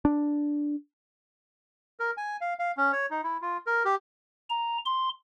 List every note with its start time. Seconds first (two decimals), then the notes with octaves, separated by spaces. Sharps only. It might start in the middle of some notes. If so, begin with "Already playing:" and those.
0.05 D4
2.00 A#4
2.17 G#5
2.41 F5
2.59 F5
2.77 C#4
2.92 C#5
3.10 D#4
3.24 E4
3.42 F4
3.67 A#4
3.85 G4
4.50 A#5
4.85 C6